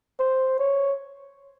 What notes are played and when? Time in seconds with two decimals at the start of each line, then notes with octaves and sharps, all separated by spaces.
0.20 C5
0.59 C#5